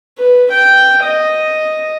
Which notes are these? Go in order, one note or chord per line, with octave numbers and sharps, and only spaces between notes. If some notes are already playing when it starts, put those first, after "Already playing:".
B4
G5
D#5